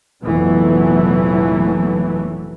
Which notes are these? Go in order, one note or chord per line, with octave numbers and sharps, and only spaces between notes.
F1 A#1 E3 F#3 A3 B3